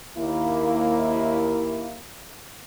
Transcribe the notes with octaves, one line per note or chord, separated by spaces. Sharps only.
D#2 A#3 E4